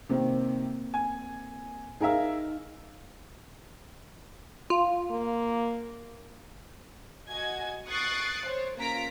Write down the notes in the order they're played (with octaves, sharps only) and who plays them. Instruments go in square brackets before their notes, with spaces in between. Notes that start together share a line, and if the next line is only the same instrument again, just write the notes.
[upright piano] C3 D#3 [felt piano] A#3 C4
[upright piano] G#5
[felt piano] D#4 F5 [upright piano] G#4 A#4 E5
[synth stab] F4
[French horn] A#3
[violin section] F#4 D#5 G#5 G#6
C#6 D#6 F#6 A6 C7 D7
C5 C#5
A#3 C#4 F4 A#5 B6 D7